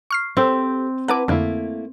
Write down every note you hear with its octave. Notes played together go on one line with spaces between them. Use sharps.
C#6 F6 C7
C4 G4 A4 C5
E4 B4 F#5 A5 A#5 D6
F2 D3 A3 A#3 E4